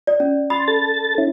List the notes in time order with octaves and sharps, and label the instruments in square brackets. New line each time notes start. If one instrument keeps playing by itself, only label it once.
[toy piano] D5
C#4
[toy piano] B5 [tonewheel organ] C6 A6
[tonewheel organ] A4 A6
C#4 E4